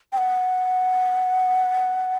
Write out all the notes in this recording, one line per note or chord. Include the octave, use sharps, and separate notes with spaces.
G5
F#5